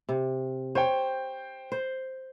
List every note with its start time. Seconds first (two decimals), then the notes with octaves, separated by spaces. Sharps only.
0.09 C3
0.75 C5 C#5 G5
1.72 C5